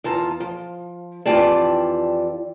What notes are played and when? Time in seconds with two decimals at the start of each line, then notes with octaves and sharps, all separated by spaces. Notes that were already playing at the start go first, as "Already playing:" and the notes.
0.04 E2 F4 A5 A#5
0.40 F3
1.26 F2 E3 F4 G4 D5 A5